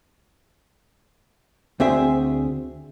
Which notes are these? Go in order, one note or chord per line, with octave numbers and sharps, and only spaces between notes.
D2 C4 G#4 E5